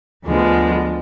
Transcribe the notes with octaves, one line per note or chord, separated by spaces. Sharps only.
D2 D3 F3 G#3 B3